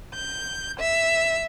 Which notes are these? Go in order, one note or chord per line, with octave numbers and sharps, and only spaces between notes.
G6
E5